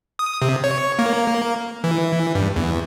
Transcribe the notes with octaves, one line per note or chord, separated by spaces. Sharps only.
D#6
C3
C#5
A#3
E3
G2
E2